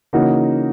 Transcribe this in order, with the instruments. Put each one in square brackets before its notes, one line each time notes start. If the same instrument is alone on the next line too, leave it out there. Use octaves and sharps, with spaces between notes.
[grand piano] C#3 E3 A#3 D#4 F#4